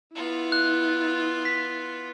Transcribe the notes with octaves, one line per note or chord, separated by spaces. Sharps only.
B3 E4 F4
F#6
B6